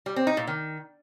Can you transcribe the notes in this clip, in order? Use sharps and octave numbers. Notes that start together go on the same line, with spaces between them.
G3
C4
D#4
A#2
D#3